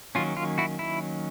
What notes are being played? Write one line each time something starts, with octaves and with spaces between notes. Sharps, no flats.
D#3 F#3 A#3 C#4 F4
F4
E4 F#4
E4